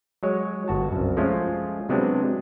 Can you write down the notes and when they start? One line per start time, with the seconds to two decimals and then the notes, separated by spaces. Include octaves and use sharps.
0.23 F#3 G#3 C#5
0.68 G1 F#4 A5
0.92 C2 F#2
1.17 F3 G#3 A3 C#4 F4
1.89 C3 F#3 G#3 B3 C4 D4